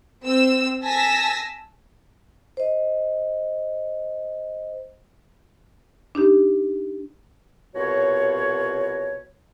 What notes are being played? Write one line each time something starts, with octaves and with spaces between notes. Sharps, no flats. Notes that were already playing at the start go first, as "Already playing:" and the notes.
C4 E6
G#5 A5 E6 A#6 B6
C5 D#5
D4 D#4 G4
C2 B2 F4 F#4 C#5